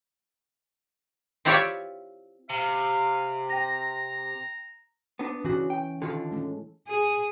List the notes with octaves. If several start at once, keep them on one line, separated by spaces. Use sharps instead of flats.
C4 E4 F4 G4 C#5 D5
C3 F5
G5 A#5 A#6
B3 D4
C#3 E3 C#4 D4 F#4
G5
D3 D#3 F4 A4
G#3 A3 C#4
G#4